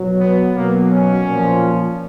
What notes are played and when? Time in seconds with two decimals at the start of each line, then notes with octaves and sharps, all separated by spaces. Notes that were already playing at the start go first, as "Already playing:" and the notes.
Already playing: B2 F#3
0.20 B3
0.55 B2 F#3 A#3
0.91 C#4
1.27 A#2 F3